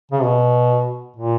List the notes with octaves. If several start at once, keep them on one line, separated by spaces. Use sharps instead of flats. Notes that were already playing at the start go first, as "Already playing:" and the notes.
C#3
B2
A#2